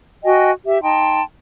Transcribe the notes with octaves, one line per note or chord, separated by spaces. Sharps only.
F#4 D#5 G5 G#5
G4 E5
D#4 G5 A5 C6